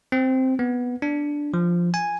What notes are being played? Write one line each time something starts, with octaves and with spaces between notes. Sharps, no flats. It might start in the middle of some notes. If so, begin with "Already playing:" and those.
C4
B3
D4
F3
G#5